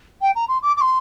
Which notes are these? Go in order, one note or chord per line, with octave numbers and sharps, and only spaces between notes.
G5
A#5
C6
D6
D6
C6